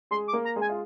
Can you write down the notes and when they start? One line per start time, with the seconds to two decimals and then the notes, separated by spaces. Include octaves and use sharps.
0.11 G#3 G#4 C6
0.28 D6
0.33 A#3 A#4
0.45 A#5
0.56 G#3 G#4
0.61 G#5
0.69 F4